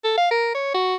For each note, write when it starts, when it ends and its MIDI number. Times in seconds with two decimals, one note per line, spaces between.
0.04 0.17 69
0.17 0.28 77
0.31 0.50 70
0.55 0.69 73
0.74 0.95 66